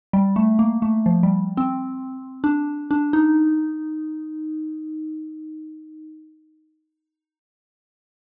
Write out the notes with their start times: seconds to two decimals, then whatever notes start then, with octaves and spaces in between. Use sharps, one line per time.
0.13 G3
0.36 A3
0.59 A#3
0.82 A3
1.06 F3
1.23 G3
1.57 C4
2.44 D4
2.91 D4
3.13 D#4